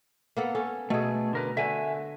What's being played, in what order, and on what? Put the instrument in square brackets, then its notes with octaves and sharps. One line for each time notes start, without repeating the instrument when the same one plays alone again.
[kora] A#3 B3 A4
C#4 A4
[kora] B2 A4 [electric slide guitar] A3 G#4
[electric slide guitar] D3 A#4 B4
[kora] D3 A3 [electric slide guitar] E5 G#5